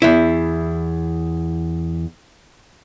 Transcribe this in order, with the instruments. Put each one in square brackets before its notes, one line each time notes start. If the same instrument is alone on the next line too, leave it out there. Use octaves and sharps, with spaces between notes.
[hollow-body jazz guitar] E2 E4